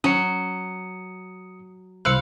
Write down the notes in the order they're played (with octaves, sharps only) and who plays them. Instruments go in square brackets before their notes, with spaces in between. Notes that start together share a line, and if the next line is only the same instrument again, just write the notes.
[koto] F#3 [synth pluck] C#4 [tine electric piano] D#6 C#7
[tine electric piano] C2 C5 F#6 [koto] F5 [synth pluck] B5 E6 C#7